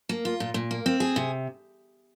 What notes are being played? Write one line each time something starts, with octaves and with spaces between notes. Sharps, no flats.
A#3
F4
A#2
A#2
A#3
C4
G#4
C3